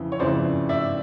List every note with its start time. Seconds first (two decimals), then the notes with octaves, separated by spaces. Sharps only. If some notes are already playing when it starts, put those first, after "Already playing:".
Already playing: F2 C#3 E3
0.12 C#5
0.20 F2 C#3 E3 C5 D5
0.69 D5 E5